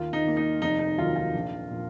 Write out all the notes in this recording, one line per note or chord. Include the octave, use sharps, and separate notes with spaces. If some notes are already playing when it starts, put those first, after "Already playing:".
Already playing: D#2 F4
D#4
D#3 A#3
D#4
F1 D#4
D#4
D#2 D#3 F#3 F4
F4
A#1
A#2 F3